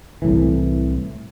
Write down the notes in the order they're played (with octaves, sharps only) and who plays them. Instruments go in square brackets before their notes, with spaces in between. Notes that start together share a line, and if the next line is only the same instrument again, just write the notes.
[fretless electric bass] C2 A2 E3